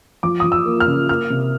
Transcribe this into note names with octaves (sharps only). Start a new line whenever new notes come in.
F3 D6
F3 D#6
E6
A#3
F6
C#3
A#3 F6
C3